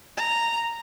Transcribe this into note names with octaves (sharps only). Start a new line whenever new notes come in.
A#5